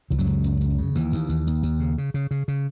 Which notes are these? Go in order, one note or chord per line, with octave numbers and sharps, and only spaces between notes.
C#2 E3
F#2 F#3
C#2
C#2
C#2
C#3
D#2 E3
D#2
D#2
D#2
D#2
C#3
C#3
C#3
C#3
C#3